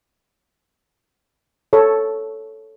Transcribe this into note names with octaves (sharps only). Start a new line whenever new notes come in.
A4 C#5